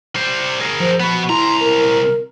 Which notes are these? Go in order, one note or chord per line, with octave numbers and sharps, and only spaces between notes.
G3 C5
G#4 A#4
F3 C5
B3 F#4 B5
C2 E4 A#5 C6
A#4